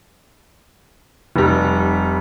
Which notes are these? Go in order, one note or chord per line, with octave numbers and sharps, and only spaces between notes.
F1 G3